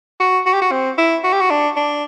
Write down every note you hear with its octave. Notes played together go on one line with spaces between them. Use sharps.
F#4
F#4
G4
F#4
C4
E4
F#4
G4
F#4
D4
D4